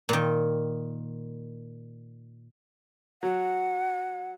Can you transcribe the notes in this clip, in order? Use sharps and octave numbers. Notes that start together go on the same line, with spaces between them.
A#2 D#3
F#3 F#5